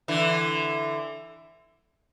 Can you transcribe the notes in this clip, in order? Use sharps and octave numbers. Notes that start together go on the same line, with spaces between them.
D3 E3